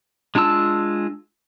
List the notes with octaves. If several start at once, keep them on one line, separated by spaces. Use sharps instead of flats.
G#3 D4 F4 A5 E6